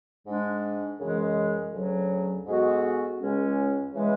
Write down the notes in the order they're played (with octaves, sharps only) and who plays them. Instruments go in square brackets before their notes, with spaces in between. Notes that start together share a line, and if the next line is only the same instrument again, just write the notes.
[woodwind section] G#2 G#3 D4
F#2 C#3 E3 G#3
D2 C#3 F#3
G#2 G#3 B3 F#4 A4
C#2 C#3 G#3 C#4
C#3 E3 G#3 B3